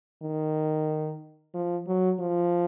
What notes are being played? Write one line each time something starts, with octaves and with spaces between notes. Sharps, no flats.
D#3
F3
F#3
F3